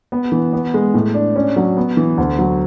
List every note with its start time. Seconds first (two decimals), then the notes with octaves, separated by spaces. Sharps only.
0.12 B3
0.32 E3
0.53 B3
0.74 G#3
0.94 A2
1.14 D4
1.36 C#4
1.56 F#3
1.77 B3
1.97 E3
2.18 D2
2.39 F#3